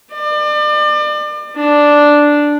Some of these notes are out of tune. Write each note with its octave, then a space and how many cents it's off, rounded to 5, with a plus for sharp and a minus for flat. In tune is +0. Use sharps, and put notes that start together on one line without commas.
D5 +35
D4 -5